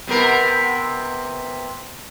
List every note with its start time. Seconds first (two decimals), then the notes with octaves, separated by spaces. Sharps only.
0.07 C3 B3 A#4